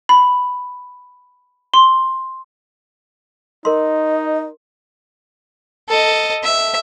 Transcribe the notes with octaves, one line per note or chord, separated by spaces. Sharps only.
B5
C6
D#4 A#4 D#5 C6
A4 D#5
E5